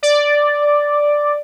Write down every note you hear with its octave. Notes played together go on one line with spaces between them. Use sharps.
D5